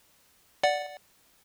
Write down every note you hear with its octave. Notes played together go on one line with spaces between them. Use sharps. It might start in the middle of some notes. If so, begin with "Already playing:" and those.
D5 F#5